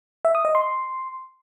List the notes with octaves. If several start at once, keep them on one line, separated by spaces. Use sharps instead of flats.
E5
D#6
D#5
C6